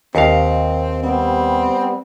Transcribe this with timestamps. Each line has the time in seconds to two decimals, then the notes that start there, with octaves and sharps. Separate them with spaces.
0.15 D#2 C4 F5
1.03 G3 B3 C4